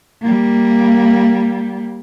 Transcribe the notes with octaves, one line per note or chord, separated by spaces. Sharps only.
G3 A#3